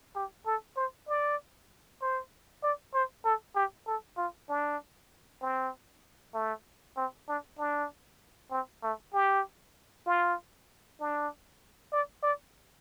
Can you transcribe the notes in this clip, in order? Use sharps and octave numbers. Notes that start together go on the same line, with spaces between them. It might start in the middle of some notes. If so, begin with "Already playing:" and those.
G4
A4
C5
D5
C5
D5
C5
A4
G4
A4
F4
D4
C4
A3
C4
D4
D4
C4
A3
G4
F4
D4
D5
D5